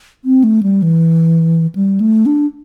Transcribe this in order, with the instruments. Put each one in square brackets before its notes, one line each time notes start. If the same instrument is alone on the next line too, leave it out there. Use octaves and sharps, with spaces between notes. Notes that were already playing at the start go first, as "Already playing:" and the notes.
[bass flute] C4
A3
G3
E3
G3
A3
D4